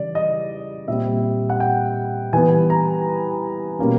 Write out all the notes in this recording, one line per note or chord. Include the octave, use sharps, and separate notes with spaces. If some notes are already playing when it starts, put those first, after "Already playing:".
Already playing: C#3 E3 G3 D5
D#5
A#2 G3 C4 E5
F#5
G5
E3 G3 B3 G#5
A#5
B2 G3 A#3 C#4